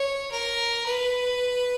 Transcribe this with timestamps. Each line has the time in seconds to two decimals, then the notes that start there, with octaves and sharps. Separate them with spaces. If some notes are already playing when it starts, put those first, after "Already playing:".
Already playing: C#5
0.31 A#4
0.86 B4